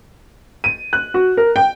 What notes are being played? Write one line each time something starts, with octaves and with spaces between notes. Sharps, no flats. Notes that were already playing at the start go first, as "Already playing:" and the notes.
D#7
F#6
F#4
A#4
G5